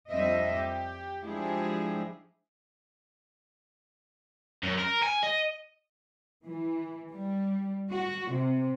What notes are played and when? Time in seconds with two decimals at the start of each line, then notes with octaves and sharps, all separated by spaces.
0.10 F2 G3 C4 D4 D#5 E5
0.53 G4
1.24 F3 G#3 D4 E4 G4 G#4
4.63 F#2
4.78 A#4
5.03 G#5
5.23 D#5
6.45 E3
7.11 G3
7.91 F#4
8.32 C3